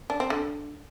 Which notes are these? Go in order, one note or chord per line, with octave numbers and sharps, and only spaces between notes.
D4
C4
D3